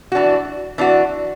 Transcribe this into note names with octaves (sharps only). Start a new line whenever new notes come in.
E3 D4 F#4
E3 D4 F#4